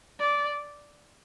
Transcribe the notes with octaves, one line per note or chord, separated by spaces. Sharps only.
D5